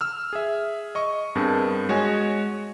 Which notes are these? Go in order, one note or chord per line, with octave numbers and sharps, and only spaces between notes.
E6 F6
G#4 E5
D#5 C#6
G2 B3 C4 G#4 A#4 A5
G#3 F#4 C#5 D#5 G#5